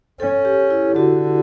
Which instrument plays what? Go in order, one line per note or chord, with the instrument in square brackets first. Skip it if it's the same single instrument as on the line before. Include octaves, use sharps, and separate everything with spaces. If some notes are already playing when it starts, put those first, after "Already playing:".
[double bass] C#4 [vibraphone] A4
[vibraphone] G4
E4
[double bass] D3 [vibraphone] F#4